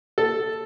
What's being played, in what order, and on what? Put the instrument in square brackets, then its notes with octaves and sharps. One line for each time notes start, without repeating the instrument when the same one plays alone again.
[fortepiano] A4